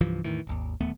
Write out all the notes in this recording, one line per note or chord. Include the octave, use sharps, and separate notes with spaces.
C2 G2 E3 F3
E2 A2 D#3 E3
D1 G#1 D#2
D1 D#2 A3 B3